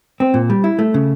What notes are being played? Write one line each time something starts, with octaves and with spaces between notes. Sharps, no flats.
C4
A#2
G3
E4
A3
C#3